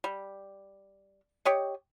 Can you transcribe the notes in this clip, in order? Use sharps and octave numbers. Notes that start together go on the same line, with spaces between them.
G3
G4 C#5 D#5